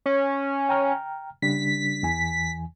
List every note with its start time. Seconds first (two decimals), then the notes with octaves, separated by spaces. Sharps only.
0.06 C#4
0.69 G5 A#5 F6
1.42 C#3 G3 D4 B6
2.03 E2 E3 G#5